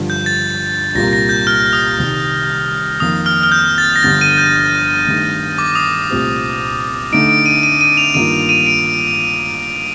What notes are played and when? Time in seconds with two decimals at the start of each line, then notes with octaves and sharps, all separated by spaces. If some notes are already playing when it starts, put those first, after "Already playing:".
Already playing: G2 D3 F3
0.10 G6
0.26 A6
0.95 C2 A#2 G3 A#3 A#6
1.13 A#6
1.29 G6
1.47 F6
1.73 D#6
1.98 C2 C3 D#3 G3
3.00 F2 D#3 A#3 D#6
3.26 F6
3.43 F6
3.52 G6
3.78 A6
3.96 A#6
4.03 G1 G2 D3 A6
4.21 D#7
4.38 G6
5.07 G2 D#3 A3
5.58 D6
5.75 D#6
6.09 C2 A#2 A3 C4 G4
7.12 D3 A3 D#4 D7
7.29 D7
7.46 D#7
7.63 D#7
7.81 D#7
7.97 F7
8.14 G2 D#3 A#3 F4 D#7
8.49 D#7
8.66 D7